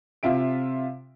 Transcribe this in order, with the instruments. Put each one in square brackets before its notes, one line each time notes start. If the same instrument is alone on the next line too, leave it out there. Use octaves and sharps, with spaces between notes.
[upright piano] C3 F4 E5 D7